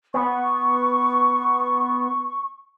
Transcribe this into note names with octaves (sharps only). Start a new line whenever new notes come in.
B3 C#6